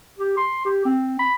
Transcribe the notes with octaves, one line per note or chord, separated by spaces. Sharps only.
G4
C6
G4
C4
B5